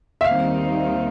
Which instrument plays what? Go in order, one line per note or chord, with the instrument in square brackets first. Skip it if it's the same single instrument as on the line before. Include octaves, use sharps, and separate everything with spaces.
[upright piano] E5
[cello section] D#2 D#3 G3 C4 D#4 [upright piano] F5